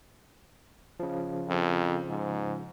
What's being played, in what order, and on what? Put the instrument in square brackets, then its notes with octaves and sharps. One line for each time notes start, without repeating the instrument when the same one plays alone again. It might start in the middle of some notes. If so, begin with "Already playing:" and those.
[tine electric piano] C#3 F3
[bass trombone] F2
G#2